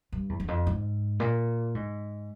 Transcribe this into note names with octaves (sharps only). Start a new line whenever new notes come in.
G2
E2
E2
F2
G#2
A#2
G#2